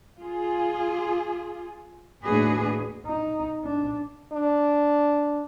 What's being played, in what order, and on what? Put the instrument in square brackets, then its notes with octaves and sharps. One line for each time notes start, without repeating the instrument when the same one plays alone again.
[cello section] F4 G#4
D#2 A2 D4 F#4 G#4 B4
[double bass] D#4
D4
[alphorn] D4